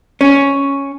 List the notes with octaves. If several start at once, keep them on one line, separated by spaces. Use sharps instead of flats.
C#4